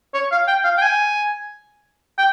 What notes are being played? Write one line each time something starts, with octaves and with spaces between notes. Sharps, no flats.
C#5
F5
G5
F5
G5
G#5
G5